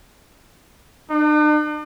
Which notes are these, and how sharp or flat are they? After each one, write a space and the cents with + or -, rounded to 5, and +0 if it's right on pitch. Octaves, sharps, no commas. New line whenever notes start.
D4 +45